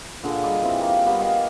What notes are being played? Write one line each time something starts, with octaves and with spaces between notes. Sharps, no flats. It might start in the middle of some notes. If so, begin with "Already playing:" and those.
A#2 D3 G#4
G3 D5 D#5
E3 C4
A#3
G3 A#3 B3 G4
D#5 F5 G#5